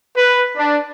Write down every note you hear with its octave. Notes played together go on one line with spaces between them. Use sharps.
B4
D4